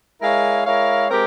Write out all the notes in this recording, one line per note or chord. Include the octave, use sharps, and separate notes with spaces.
G#3 E4 A#4 C#5 F5
G#3 E4 A#4 C#5 F5
G#3 C4 G4 A#4